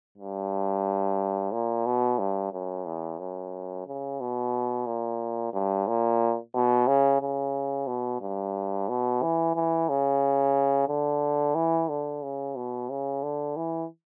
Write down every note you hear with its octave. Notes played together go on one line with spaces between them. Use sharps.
G2
A#2
B2
G2
F#2
E2
F#2
C#3
B2
A#2
G2
A#2
B2
C#3
C#3
B2
G2
B2
E3
E3
C#3
D3
E3
D3
C#3
B2
C#3
D3
E3